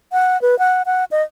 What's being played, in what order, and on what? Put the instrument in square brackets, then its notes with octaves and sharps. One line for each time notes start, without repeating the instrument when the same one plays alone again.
[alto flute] F#5
B4
F#5
F#5
D#5